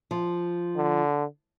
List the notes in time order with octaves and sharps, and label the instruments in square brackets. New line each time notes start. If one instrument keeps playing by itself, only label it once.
[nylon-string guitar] F3
[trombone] D3